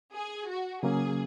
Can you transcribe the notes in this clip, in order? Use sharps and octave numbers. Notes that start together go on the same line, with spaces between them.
G#4
F#4
C#3 F#3 A#3 C#4 G#4